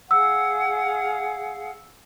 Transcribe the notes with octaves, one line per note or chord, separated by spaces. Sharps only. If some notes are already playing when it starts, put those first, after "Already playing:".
G#4 F5 F#5 E6